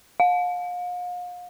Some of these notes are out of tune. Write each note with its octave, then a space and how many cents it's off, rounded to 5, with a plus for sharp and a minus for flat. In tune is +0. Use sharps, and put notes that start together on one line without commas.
F5 +40